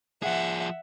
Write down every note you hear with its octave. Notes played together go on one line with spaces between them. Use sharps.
F3 G#4 E5 F#5